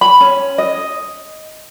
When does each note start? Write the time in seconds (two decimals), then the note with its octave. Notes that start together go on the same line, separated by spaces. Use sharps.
0.01 B5
0.20 C#4
0.58 D#5